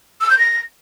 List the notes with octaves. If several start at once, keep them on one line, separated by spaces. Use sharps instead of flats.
E6
G6
A#6